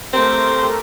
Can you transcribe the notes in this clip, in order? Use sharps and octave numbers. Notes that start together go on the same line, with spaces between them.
A3 C4 G4 A#4 C6